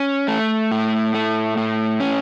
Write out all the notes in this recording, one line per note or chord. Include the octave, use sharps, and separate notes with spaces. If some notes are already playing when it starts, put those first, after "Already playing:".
Already playing: C#4
A3
A2
A3
A2
C#4